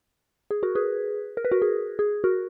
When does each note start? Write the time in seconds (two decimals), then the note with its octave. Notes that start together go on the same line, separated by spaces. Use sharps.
0.51 G#4
0.63 F#4 A#4
0.75 G#4 B4
1.37 A#4
1.45 B4
1.52 F#4 A#4
1.62 G#4
1.99 G#4
2.24 F#4 A#4